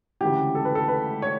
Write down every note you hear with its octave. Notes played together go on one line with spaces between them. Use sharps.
D2 C#3 E3 G4
A4
B4
A4
B4
C#5